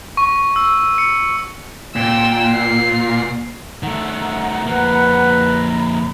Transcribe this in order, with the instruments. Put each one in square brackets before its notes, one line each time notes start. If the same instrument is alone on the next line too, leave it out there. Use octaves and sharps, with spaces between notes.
[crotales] C#6
E6
C#7
[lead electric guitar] A#2 [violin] G5 E6
[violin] C7
[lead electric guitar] D#3 A3 [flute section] F#5 A#5
[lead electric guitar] F2 A#3 [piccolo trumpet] B4
[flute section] A#5 B5